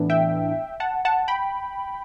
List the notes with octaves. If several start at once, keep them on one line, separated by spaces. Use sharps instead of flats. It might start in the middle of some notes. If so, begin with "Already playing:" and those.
Already playing: A2 E3 B3 D4
E5 G5
F#5 A5
F#5 A5
G5 B5